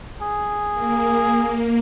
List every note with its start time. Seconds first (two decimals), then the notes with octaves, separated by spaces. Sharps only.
0.22 G#4
0.72 A#3